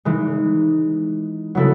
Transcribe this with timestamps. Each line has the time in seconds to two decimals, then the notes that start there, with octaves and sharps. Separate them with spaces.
0.05 E3 G#3 D#4
1.55 C#3 F#3 B3 E4 A4